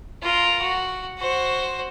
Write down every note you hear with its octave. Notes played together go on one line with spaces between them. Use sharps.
F4 A#4
F#4
F#4 C5